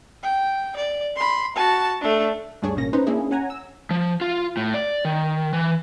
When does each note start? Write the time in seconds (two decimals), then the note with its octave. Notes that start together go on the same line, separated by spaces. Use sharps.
0.23 G5
0.76 D5
1.16 B5 C6
1.56 F#4 A5
2.01 A3 D4
2.62 D2 G2 G3 D4 G#4 C#5
2.76 A1 B2 A#3 C#4 A#6
2.93 C#4 D#4 B4 C5
3.07 A#3 C#4 D4 E4 G#4
3.31 C#4 F#5 G#5 A#5
3.50 E6
3.91 F3
4.21 F4
4.57 A2
4.74 D5
5.05 D#3
5.53 E3